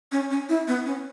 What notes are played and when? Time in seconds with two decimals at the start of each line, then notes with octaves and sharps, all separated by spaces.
0.12 C#4
0.31 C#4
0.49 E4
0.68 B3
0.86 C#4